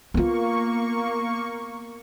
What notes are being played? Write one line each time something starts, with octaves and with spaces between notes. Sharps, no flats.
A#3 B3 F4 C#6